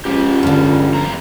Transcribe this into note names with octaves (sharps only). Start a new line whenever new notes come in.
C#2 F3 G4
G2 D3
E2 C3 A#5